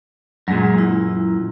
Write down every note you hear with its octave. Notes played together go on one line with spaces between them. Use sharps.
F#2 A#2 F#3 G#3 G#4
E4